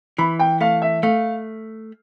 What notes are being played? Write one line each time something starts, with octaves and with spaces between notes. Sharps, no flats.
E3 B5
G5
A3 F5
E5
A3 F5